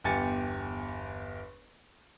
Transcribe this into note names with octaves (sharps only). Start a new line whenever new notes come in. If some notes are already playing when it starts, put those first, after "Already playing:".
G1 E2 G4 G#5 A6 C#7